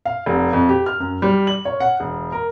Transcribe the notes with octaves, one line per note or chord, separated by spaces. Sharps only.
F5
F1
F2
G4
F6
F#2
G3
F#7
C#5
F#5
E1
A#4